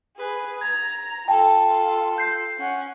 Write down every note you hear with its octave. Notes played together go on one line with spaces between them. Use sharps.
G#4 B4
A#5 G#6
F4 A4 G5 A5
G6 C7
C#4 F#5